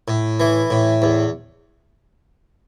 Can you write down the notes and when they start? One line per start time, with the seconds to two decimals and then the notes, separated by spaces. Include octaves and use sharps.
0.08 A2
0.40 E3
0.70 A2
1.02 E2